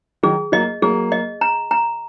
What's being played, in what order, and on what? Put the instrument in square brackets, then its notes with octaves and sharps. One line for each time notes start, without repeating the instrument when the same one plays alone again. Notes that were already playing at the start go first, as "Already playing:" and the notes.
[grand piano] D#3 F#3 [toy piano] G#4
[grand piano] F#3 A#3 [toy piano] D#5
[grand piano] F#3 A#3 [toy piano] G#4
[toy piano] D#5
A#5
A#5